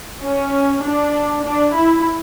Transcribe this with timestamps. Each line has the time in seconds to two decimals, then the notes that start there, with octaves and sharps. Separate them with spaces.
0.21 C#4
0.82 D4
1.43 D4
1.73 E4